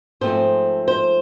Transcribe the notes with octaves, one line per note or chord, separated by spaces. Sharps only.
G#2 F3 A3 C4 C5
C5